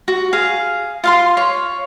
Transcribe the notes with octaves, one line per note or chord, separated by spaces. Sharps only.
F#4
G#4 F5
F4 F5 C6
C#5